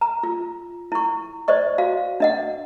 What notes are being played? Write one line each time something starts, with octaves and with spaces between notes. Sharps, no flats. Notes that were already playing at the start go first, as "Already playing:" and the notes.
A#5
F4
E4 C#6
C5 D5 D#5 C#6
F#4 F5
D4 D#5 F#5